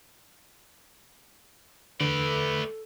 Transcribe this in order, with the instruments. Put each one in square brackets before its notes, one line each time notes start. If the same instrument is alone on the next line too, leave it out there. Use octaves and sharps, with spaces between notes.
[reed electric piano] E2 D3 [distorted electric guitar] A3 D5 [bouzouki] A4 [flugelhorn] B4